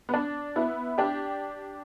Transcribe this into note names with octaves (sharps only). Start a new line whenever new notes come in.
B3
D4
B3 E4
D4 G4